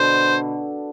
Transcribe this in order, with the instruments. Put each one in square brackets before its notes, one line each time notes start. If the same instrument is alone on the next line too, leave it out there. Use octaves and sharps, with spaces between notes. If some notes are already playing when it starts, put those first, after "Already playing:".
Already playing: [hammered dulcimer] B2 D3 [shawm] C5